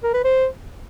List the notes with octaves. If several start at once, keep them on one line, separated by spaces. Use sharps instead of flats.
A#4
B4
C5